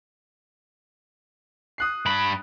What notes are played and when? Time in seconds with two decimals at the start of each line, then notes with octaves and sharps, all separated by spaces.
1.78 D#6 F#6 C7
2.06 G2 B5